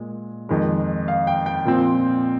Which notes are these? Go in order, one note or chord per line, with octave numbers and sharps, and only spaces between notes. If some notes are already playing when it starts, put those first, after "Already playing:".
Already playing: A#2 G#3
F2 D#3 G#3
F5
G5
G5
A#2 F3 C4